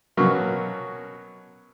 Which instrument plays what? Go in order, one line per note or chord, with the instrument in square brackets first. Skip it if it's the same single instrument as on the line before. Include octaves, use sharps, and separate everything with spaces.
[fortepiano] B2 F#3 A#3 C#4 F6